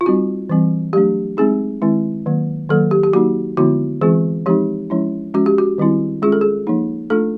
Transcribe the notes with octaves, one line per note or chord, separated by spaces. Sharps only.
F4
G3 C4 D#4 F#4
E3 G3 C4
F#3 A3 D4 G4
G#3 C4 D#4 G#4
D#3 G#3 C4 E4
D#3 F#3 A#3
D#3 F#3 A#3 A4
G4
G4
F#3 A#3 D#4 F#4
D3 F3 G#3 B3 E4 F#4
E3 G#3 C4 F4 G#4
F3 G#3 C4 D#4 G4
F3 G#3 C#4 E4
F3 G#3 C#4 F#4
G4
F#4
D#3 G3 C4 E4
G#3 C#4 F4 G#4
A4
G#4
F3 A#3 D#4
A3 D4 F4 A4